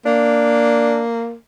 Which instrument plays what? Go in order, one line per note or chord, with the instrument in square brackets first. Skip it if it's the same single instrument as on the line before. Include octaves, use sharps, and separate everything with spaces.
[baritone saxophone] A#3 [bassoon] D4